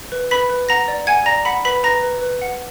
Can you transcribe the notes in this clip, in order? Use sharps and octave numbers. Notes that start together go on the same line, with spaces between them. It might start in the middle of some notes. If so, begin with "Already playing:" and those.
B4
B4 B5 B6
B4
F#5 A#5 A#6
D5
F#5 G#5 G#6
D5 A#5 A#6
F#5 B5 B6
B4 B5 B6
B4 A#5 A#6
B4
B4
F#5